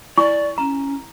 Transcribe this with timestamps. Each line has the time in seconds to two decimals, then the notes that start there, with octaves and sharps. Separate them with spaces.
0.18 E4 D5 G#5 C#6
0.58 C#4 A#5